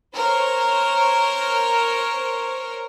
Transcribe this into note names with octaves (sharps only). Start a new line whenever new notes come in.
A#4 C5 C#5